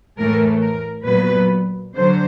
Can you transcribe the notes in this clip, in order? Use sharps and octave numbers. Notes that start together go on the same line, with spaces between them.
A2 E3 A3 A#4
A#4
A#2 F#3 B3 B4
D3 F#3 C5